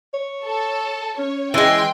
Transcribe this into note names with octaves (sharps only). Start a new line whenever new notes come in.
C#5
A4
C#4 C#5
E3 G#3 G5 C6